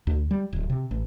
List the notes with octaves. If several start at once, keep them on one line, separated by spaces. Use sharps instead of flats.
D2
G3
D1
C3
A1